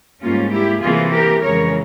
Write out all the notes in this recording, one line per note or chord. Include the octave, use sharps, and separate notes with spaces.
G#2 G3 A#3 C#4 F4
E4 G4
C3 E3 A#3 F4 G#4
G4 A#4
F2 C#3 E3 G#3 A#4 C#5